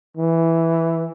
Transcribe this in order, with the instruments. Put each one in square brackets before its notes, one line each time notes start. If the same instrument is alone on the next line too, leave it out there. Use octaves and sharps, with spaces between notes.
[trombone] E3